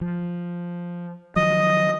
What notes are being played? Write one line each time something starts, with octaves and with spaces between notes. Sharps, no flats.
F3
D#3 F3 F#3 D#5 D#6